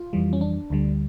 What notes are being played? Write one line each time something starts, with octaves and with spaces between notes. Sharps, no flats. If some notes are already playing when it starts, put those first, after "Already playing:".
Already playing: F4
F2 E3 G3
C#4
D4
D2 D3 G3